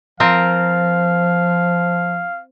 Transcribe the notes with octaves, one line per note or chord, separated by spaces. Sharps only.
F3 C4 F4 A#4 F5